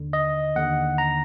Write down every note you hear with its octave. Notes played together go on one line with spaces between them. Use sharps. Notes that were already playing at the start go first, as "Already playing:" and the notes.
Already playing: D#2 D3
D#5
D#2 D3 F#5
A#5